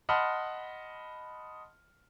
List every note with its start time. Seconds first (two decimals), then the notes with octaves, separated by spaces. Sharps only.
0.09 D#5 F#5 A5 B5 C6 F6